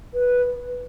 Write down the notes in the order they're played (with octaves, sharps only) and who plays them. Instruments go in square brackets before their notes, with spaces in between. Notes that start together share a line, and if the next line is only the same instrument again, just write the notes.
[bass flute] B4